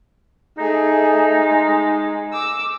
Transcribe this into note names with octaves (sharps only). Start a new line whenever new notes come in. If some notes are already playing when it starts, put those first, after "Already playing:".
A3 D#4 G#4
G#3
D6 E6